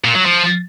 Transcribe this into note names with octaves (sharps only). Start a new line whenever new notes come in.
A#2
F#3
F3